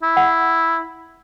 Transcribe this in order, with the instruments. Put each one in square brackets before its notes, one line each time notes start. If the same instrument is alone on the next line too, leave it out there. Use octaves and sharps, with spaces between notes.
[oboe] E4
[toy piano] F#5